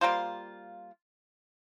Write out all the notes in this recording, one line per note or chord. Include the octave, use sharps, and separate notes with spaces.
G3 A#3 F4 C5